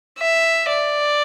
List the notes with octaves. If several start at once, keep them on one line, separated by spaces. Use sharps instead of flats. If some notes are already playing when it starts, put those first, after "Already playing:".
E5
D5